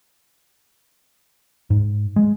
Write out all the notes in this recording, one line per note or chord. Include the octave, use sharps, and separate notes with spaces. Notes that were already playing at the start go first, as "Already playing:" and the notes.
G#2
G#3